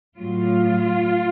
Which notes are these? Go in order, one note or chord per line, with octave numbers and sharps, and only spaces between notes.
A2 F#3 F4